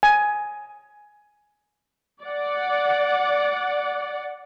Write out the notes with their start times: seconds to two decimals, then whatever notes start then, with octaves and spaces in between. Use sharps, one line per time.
0.03 G#5
2.22 D5 F#5